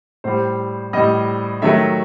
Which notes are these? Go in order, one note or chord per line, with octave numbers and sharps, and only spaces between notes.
A2 G3 C5
A2 G3 D#5
D#3 F#3 A3 E5